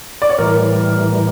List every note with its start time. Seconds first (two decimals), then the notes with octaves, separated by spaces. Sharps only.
0.22 D5
0.29 C#5
0.38 A2 E3 G3 A#4